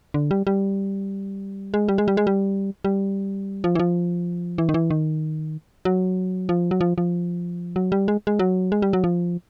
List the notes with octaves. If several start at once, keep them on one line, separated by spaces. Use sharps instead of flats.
D3
G3
G3
G#3
G3
G#3
G3
G#3
G3
G3
F3
E3
F3
E3
D#3
E3
D#3
F#3
F3
F#3
F3
F3
F#3
G3
G#3
G#3
F#3
G#3
G3
F#3
F3